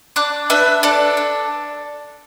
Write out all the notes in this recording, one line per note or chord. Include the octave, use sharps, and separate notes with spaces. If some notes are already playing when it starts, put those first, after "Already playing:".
D4 D6 F#6
D4 B4 E5
D4 A4 D5
D4